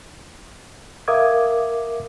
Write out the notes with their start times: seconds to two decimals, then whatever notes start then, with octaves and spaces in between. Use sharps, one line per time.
1.08 A#4 E5 F5 D6 D#6 G#6